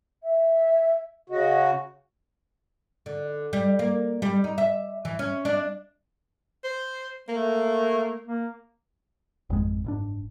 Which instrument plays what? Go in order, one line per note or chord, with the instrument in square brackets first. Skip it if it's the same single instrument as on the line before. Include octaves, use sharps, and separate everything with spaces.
[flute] E5
[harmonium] C#3 F#4 [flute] D#5
[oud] D3
G3
A#3
G3
D#4
E5
E3
C#4
D4
[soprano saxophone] C5
[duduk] A3 [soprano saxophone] A#3
[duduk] A#3
[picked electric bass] G#1 F2 G#3
F#1 G#2 D4